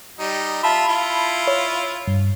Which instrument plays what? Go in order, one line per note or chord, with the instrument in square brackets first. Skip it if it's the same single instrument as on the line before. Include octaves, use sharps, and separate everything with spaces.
[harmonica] G3 D#4
[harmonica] F4 E5 [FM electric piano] A5 B5
[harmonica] E4 F4
[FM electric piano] C#5
G2